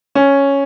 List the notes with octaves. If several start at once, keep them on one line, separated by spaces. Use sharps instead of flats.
C#4